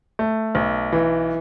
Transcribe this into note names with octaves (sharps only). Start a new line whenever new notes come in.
A3
B1
E3